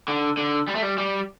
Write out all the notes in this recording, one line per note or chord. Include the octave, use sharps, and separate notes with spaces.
D3
D3
G3
A3
G3
G3